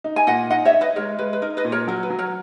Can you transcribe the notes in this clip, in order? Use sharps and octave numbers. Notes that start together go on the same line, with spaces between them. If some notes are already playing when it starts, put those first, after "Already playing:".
D#4
G#5
A#2 D#5 F#5
D#4 D#5 F#5
C#5 E5
D#4
B4 D#5
G#3 A#4 C#5
G#3 B4
B4
D#4 A#4
B4 D#5
A#2
A#4 C#5
F#3 A#4
B4
F#3
A#4 C#5